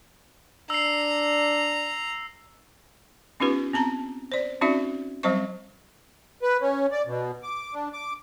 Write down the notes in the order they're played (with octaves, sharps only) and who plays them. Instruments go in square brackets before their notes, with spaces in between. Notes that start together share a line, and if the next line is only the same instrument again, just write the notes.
[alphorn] D4 [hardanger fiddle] A#5 [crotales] E6 C7
[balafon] B3 C#4 D#4 F4 G4 B4
B3 C4 A5 A#5
C5 D5
C4 C#4 D#4 F#4 D5 E5
F#3 G3 C4 C5 D#5 C#6
[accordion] B4
C#4
D5
B2
D6
D4
D6